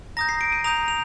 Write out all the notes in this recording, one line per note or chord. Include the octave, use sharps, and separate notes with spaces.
A#5 D#6 G6 A#6
C7
D7
D#7
A#5 D#6 G6 F7
F7